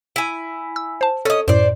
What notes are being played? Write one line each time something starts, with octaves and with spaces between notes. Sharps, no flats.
E4 G#5
E6
C5 A5
C#4 A4 D#5
F#2 A2 C5 D5